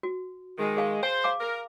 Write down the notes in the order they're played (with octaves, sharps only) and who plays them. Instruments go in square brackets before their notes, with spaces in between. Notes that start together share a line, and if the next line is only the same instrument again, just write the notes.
[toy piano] F#4
[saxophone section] D#3 G#3
[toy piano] G#4 F5 G#5
[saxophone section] C5 [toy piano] G#5
[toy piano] F5 G#5 D6
[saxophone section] A#4